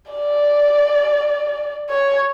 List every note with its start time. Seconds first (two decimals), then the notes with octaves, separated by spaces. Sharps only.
0.11 D5
1.89 C#5